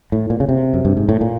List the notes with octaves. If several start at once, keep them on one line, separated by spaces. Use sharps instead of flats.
A2
A#2
C#3
C3
F#2
G2
G#2
A2
A#2